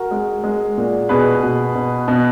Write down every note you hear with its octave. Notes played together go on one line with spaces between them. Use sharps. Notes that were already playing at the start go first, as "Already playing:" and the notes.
Already playing: F#4 A#4
G#3
G#3
A#2
B2 G#4 B4
B2
B2
B2